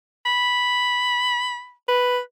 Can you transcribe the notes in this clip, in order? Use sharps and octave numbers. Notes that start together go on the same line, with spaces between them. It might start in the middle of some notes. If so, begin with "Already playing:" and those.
B5
B4